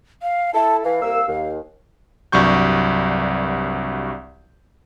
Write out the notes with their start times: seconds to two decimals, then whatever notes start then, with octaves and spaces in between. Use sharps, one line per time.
0.22 F5
0.54 E4 A4 A5
0.84 E3 F5
1.01 C2 A#3 E6
1.27 D#2
2.32 C2 G2 F#3 C#6 G6